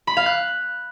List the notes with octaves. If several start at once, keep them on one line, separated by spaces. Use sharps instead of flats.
B5
F5
F#6